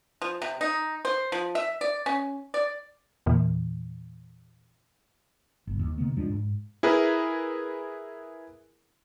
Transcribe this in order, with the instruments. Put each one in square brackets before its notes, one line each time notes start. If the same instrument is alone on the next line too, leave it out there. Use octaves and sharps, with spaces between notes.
[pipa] F3
C3
D#4
C5
F3
E5
D5
C#4
D5
[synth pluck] E2 A#2 E3
[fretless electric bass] G1 C2
D#2
C3 D#3 A#3 B3
E2 F3 G#3 D4
G#2
[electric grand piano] E4 G#4 A#4 B4